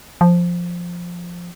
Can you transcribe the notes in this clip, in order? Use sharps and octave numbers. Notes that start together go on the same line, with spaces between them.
F3